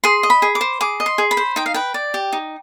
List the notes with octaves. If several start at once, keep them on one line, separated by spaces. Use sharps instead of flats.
G#4 C6
D#5
B5
G#4
D6
C5
G#4 D6
D#5
C6
G#4
B5
C5
D#4 G5
F5
B4 G5
D5
G4
D#4